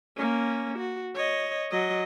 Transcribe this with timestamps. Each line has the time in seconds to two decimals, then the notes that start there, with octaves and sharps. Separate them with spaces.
0.17 A#3 C#4
0.79 F#4
1.15 C#5 D#5
1.71 F#3 D#5